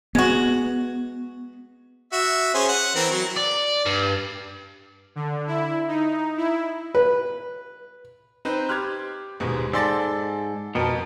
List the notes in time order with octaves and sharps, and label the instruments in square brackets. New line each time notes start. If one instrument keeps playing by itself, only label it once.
[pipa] G#3 F#4 [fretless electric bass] B3
[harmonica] F#4 E5
C#4 G#4 C5
F#5
E3 C4 A#4
F#3
[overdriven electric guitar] D5
G2
[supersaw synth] D3
E4
D#4
E4
[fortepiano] B4
[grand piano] C4 [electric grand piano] D#4 B4 C5
[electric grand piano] G4 F6 F#6 [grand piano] C6 G#6
[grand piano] D#1 G#2 B2 [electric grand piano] G#3
[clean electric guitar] G#2 [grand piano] A4 E6 [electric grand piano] D5 C6 A6
[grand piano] F2 A5 [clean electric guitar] B2 [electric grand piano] A#4